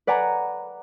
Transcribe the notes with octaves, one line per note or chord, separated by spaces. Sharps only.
B4 D5 F#5 G#5 A#5